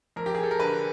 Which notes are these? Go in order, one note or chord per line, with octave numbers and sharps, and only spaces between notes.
F2 A#4
G4
G#4
A4
A#4
D3 B4